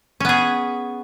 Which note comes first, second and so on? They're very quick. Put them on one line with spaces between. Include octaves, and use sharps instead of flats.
C#4 B3 G#4